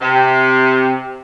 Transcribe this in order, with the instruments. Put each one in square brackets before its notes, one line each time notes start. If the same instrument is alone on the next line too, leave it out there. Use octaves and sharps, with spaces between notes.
[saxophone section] C3